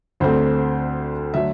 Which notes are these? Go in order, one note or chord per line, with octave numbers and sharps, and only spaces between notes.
D2 D3 A3 C4 C5
D3 F#3 A3 E5